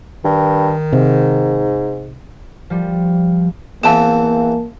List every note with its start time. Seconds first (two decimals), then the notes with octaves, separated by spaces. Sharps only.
0.25 G2 D#3
0.93 G#2 C3
2.70 F3 G3
3.83 E2 E3 A#3 C4 F5 A5 E7